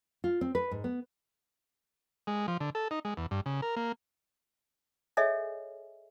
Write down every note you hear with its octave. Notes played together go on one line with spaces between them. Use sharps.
F4
C4
B4
G#2
B3
G#3
F3
D3
A4
D#4
G#3
E2
G2
C#3
A#4
A#3
G#4 A4 C#5 D#5 E5 G#5